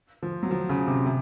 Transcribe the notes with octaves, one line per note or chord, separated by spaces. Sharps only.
F3
F#3
F3
C#3
C3
C3